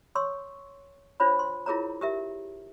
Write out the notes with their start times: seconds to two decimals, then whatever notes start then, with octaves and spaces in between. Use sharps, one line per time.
0.15 C#5 C6 C#6 E6
1.20 D4 F4 C5 C#5 B5
1.39 C6
1.66 E4 F4 G#4 A#4 C#5 A#5
2.01 G4 A#4 E5